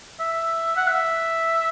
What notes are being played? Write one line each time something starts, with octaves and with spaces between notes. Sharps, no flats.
E5
F#5
E5